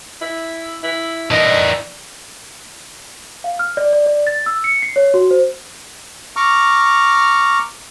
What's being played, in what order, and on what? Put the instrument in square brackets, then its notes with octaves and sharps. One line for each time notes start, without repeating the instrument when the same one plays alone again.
[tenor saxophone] E4
E4
[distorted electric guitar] E3 A#4 [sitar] D4 [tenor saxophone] D#4
[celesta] F5
F6
D5
D5
D5
A6
E6
C#7
C7
C#5
F#4
C5
[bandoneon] A#5 C#6 D6 F6